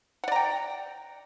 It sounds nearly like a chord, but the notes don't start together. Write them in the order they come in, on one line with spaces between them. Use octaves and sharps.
F#5 D5 A#5 G5